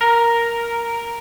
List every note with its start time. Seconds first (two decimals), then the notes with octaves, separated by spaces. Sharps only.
0.01 A#4